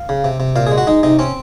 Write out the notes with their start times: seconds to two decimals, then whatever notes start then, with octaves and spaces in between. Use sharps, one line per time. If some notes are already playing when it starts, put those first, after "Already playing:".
Already playing: F5
0.09 C#3
0.24 C3
0.40 C3
0.56 A#2 F5
0.67 G#4
0.72 G#3
0.78 F#4
0.87 G#3 D#4
1.03 C3 D#4
1.19 C4 C#4